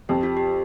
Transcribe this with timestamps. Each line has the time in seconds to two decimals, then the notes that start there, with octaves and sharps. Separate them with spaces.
0.09 F2 G4
0.23 F4
0.37 G4